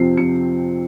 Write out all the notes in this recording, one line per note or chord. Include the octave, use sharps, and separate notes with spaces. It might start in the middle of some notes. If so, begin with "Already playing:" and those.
Already playing: F2 C3 F3 C4 C7
C3 F3 C4 C#7